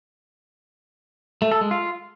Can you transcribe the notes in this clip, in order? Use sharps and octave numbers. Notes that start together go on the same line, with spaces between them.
A3
A4
G#3
F4